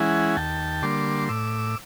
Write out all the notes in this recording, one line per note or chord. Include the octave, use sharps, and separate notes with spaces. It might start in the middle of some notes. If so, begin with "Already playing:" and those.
Already playing: E3 G#3 C#4 E4 F#5 G#5
D#2 G5 A5
D3 G3 A#3 C6 D6
A2 D6 E6